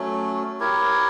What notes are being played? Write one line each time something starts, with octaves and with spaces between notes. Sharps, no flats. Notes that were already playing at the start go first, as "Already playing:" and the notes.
Already playing: F#3 A3 C#4
E4 G4 A#4 C#5